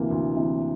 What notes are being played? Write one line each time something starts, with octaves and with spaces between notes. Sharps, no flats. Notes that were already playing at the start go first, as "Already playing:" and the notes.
Already playing: D2 C3 E3 A#3
D2
C3 E3 A#3